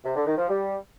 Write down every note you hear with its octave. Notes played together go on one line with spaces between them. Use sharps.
C3
D3
D#3
F3
G3